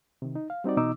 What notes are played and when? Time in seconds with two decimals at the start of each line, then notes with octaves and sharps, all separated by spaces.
0.22 C3 D#3
0.35 D#4
0.50 F5
0.64 G3 C4 D#4 F#4 D5
0.77 B2 E3 B3 D#4 D6 E6